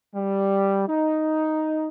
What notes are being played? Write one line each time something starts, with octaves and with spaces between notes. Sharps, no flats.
G3
D#4